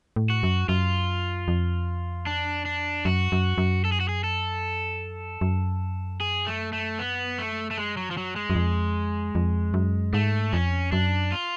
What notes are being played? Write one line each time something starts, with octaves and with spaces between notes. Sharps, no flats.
A2
F#4
F#2
F#2 F4
F2
D4
D4
F#2 F#4
F#2
F#2
A4
G#4
F#4
G#4
A4
F#2
G#4
A3
A3
B3
A3
A3
G#3
F#3
F3
F#3
G#3
F#2
F2
F2
F#2
G#2 A3
F2 C#4
F#2 D4
F4